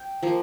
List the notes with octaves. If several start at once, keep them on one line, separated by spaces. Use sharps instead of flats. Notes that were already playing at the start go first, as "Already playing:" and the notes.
Already playing: G5
F3 A#3